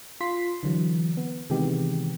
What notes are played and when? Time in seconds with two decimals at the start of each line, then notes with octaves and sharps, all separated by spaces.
0.21 F4 C6 B6
0.63 D3 E3 F#3
1.17 B3
1.50 C3 D#3 E3 G#3 B3 G4